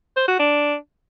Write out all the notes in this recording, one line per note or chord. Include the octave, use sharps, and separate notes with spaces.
C5
F#4
D4